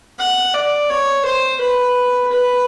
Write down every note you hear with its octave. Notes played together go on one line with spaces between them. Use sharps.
F#5
D5
C#5
C5
B4
B4